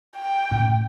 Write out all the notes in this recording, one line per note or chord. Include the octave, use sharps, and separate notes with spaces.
G5
A2 C#4